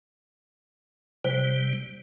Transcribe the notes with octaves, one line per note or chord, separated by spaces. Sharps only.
C3 G3 C5